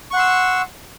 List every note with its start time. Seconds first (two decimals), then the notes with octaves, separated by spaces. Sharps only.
0.11 C#6
0.14 F#5
0.16 C6
0.19 E6